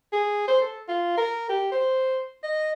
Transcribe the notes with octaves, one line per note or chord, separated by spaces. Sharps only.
G#4
C5
A4
F4
A#4
G4
C5
D#5